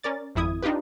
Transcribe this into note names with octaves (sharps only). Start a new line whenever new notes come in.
C#4 A#4 D5 A6
G#1 F2 E4 D#6 G#6
D4 D#4 F4 G4 B4